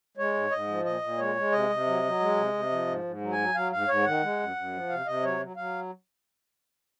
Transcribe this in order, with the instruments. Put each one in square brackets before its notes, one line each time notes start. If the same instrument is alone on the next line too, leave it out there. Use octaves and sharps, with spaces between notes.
[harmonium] G#3 C#5
G#2
G#2 D#5
F3
A#2 D#5
A#2
G#3 C#5
G#3
C3 D#5
C3
F#3
F#3
G#3
C3
C3
F3
G#2
G#2
F#3
G#5
F#3
F#3 F5
G#2 F5
G#2 C#5
D#3 F#5
G#3
F#2
F#2
F3
C3 F5
C3 D#5
F#3 C#5
F#3
F#3 F5